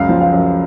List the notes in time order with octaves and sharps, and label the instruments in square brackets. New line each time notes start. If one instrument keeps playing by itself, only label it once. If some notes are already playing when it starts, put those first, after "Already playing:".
Already playing: [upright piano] C#2 F#2 F5
F3
F5
F#2